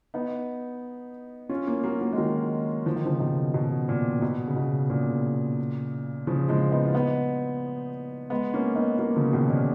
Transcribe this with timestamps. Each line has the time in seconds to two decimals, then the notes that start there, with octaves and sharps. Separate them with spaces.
0.14 B3 D#4
1.49 C#4 F4
1.67 A#3 C#4
1.84 F#3 A#3
2.01 F#3 A#3
2.13 G#3
2.18 D#3 F#3
2.86 F3
2.96 D#3
3.06 C#3 F3
3.20 B2 D#3
3.54 B2
3.89 A#2
4.22 B2
4.48 C#3
4.56 B2
4.90 A#2 C#3
6.27 C#3 F3
6.49 F3 G#3
6.71 B3 D#4
6.85 F4
6.94 B3 D#4
8.30 G#3 B3
8.54 A#3 C#4
8.76 B3 D#4
8.99 F#3 A#3
9.16 C#3 F3
9.33 B2 D#3
9.50 A#2 C#3